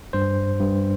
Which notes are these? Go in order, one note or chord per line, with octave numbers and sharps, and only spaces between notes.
G2 C5
G2